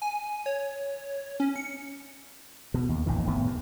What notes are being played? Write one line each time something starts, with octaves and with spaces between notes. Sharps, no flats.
G#5
C#5
C#4
C#7
B2
D#2
A1 F2 A#2 D#3
F#1 A2 D#3 B3
D#2 C3